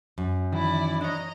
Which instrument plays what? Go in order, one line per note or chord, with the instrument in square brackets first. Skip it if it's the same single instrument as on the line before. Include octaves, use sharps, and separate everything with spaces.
[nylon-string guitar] F#2
[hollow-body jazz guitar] D#3 [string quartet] E3 E4 D5
[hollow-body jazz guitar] D4 C#5 [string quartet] D#5 A#5